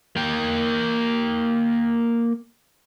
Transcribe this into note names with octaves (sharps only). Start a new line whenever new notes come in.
A#3 G5